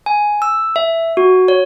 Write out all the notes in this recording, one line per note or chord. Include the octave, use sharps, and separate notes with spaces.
G#5
E6
E5
F#4
C#5